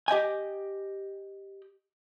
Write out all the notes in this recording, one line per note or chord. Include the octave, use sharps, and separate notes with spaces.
G4 D#5 G5 G#5